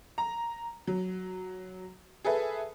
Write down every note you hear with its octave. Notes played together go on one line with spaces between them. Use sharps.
A#5
F#3
G#4 A4 B4 E5